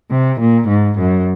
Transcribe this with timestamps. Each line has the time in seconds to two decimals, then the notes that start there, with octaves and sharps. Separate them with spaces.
0.11 C3
0.40 A#2
0.69 G#2
0.98 F#2